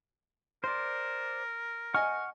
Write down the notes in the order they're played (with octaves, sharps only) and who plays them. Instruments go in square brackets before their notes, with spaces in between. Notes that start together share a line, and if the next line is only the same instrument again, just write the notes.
[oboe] A#4 [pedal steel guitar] C5 D5 [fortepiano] C6
[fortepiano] D#5 G#5 [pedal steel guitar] F#5 C#6 F6